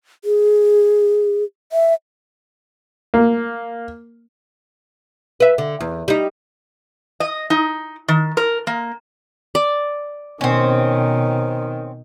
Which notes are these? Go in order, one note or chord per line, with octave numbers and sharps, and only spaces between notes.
G#4
E5
A#3
B4 E5
D3
E2
G3 D#4
D#5
D#4
D#3
A#4
A#3
D5
B2 D#3 C4 C#4